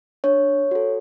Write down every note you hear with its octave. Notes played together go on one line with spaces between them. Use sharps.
D4 C#5
F#4 A4